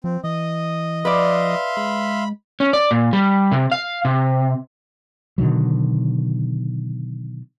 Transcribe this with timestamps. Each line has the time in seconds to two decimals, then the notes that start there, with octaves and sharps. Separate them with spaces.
0.04 F3 C4
0.24 E3 D#5 D#6
1.05 F3 B4 D5 E5 F5 C6
1.77 G#3 B5
2.60 C#4
2.73 D5
2.91 A#2
3.13 G3
3.52 C3
3.72 F5
4.05 C3
5.38 B2 D3 D#3 F#3